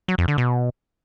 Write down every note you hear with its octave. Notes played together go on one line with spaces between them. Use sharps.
F#3
F2
D3
B2